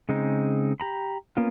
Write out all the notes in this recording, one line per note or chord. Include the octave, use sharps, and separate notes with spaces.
C#3 G#3 C4 D#4
G4 A#5 B5
A#3 B3 C#4 F4